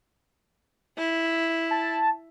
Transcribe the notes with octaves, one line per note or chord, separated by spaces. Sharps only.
E4
A5